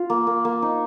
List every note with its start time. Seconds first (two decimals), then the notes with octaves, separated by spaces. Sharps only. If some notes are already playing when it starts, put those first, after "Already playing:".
Already playing: F4
0.10 A#3
0.27 A#3
0.45 A#3
0.62 D#4